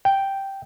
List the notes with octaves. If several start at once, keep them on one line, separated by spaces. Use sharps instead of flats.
G5